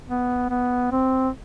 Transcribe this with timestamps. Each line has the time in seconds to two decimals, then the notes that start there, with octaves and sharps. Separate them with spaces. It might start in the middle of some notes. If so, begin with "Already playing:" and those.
0.08 B3
0.50 B3
0.91 C4